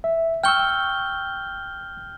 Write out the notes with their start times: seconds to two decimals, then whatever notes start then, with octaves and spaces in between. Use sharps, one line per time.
0.04 E5
0.44 G5 C#6 E6 F6 G6 G7